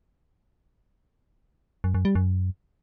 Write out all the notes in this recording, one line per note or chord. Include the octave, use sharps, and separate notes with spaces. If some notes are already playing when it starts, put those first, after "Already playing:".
F#2
F#2
G3
F#2